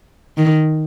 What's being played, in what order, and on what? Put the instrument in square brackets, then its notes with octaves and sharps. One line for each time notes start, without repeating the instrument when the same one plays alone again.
[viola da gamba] D#3